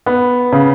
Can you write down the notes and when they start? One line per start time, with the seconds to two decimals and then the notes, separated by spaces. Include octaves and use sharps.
0.06 B3
0.53 C#3